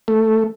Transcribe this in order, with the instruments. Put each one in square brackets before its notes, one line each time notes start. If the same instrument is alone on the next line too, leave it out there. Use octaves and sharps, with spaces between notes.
[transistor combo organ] A3